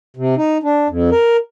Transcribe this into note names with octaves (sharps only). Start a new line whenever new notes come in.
C3
D#4
D4
F2
A#4